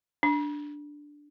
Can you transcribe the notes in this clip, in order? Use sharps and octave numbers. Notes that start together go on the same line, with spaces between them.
D4